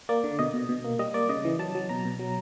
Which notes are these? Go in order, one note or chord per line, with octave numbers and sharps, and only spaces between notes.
A#3 D5
D3
B2 D#5
B2
B2
A#3
G3 D#5
A#3 D5
C#3 D#5
E3
F#3 A5
F#3
B2 A#5
B2
F#3